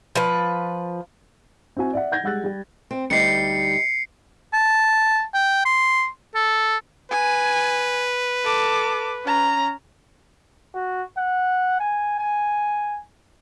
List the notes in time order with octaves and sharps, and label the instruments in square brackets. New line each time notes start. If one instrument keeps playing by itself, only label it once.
[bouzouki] F3 B4
[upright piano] C4 E4 F#4 G#5
D5 E5 F#5
F#5 G6 G#6 A#6
G3 G#3 F#5 E6 F#6 A6
G3 G4
[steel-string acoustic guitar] C4
[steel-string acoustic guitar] D2 G3 D#4 [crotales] C7 C#7
[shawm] A5
G5
C6
A4
[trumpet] B4 [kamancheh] G#5
[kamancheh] A4 D6
C#4 A#5
[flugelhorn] F#4
F#5
G#5
G#5